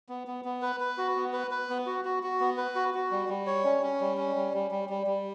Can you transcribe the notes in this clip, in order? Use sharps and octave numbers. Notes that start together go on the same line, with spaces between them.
B3
B3
B3
B4
B4
F#4
B3
B4
B4
B3
F#4
F#4
F#4
B3
B4
F#4
F#4
G3
G3
C#5
C#4
C#4
G3
C#4
G3
G3
G3
G3
G3